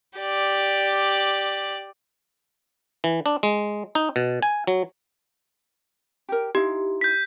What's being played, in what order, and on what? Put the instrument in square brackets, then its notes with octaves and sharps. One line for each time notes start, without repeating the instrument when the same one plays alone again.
[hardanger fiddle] G4 D5
[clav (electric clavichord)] E3
D4
G#3
D#4
B2
G#5
F#3
[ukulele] G4 A#4
[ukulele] D#4 E4 F5 [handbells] G4
[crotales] G6 B6